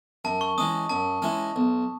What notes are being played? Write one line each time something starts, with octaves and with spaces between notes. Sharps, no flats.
F#2 A5
C#6
E3 G#3 C#4 D#6
F#2 A5
E3 G#3 C#4
B1